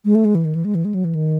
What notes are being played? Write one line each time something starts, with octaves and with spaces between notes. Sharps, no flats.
G#3
A3
G#3
E3
D#3
E3
G#3
E3
G#3
F#3
E3
D#3